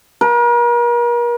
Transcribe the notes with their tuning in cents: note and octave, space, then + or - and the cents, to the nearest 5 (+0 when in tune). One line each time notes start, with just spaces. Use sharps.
A#4 +40